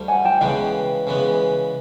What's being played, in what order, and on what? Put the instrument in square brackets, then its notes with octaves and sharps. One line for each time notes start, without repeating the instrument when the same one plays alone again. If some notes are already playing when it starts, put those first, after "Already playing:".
Already playing: [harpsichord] D2 D3 G3
[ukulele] F#5 G#5
G5 A5
[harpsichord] C#3 E3 G#3 B3 [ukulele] F5 G5
[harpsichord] C#3 E3 G#3 B3